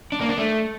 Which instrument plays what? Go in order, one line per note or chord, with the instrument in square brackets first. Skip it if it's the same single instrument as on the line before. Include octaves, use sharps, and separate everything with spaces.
[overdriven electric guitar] D4
A#3
D4
A3